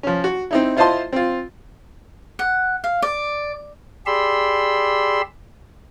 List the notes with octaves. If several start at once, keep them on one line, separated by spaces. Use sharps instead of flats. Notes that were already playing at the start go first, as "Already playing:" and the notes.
F3 C#4
F#4
C4 D#4 E4
E4 F4 C5 D#5 A5 C6
C4 F4
F#5
F5
D5
G4 G#4 D5 B5 C6 E6